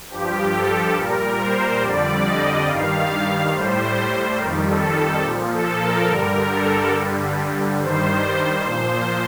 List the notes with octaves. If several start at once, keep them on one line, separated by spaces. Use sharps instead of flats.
G2 F3 G4
A4
A#2 G3 A#4
C5
F2 D3 G3 D5
D#5
G2 D#3 G3 F5
A2 G3 C5
F2 D#3 G3 A#4
A4
A4
A#2 F3 G4
A4
A#4
G2 D3 G3 A#4
A4
G2 D3 G3
G2 D#3 G3 C5
A#2 F3 C5